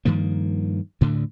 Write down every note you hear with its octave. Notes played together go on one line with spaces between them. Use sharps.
G2 D#3 F3 A#3
D2 A2 D3